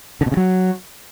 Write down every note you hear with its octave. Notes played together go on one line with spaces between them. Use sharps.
D3
B2
C#3
F#3